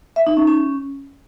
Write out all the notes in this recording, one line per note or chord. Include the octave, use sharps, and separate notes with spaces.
E5
D#4
C#4
C#4